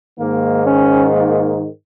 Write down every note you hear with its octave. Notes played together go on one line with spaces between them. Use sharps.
G#2 D#3 A#3
C#4
A#3